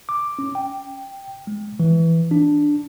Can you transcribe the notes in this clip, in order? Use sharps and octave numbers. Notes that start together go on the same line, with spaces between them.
D6
C#4
G5
G#3
E3
D4